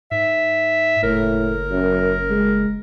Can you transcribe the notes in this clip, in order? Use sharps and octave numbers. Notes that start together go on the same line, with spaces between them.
G#2 E5
F#1 A2 A#4
F#2
G#3